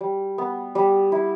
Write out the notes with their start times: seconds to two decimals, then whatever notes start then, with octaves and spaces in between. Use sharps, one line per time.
0.01 G3
0.38 B3
0.75 G3
1.12 E4